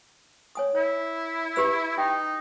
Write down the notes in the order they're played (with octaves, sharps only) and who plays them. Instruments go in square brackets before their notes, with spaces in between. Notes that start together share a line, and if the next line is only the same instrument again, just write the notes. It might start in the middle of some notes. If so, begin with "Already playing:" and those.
[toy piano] C#5 G#5 D#6
[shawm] E4 [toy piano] C#5
[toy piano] G4 B4 E6
[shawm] D#4 [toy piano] G4 G5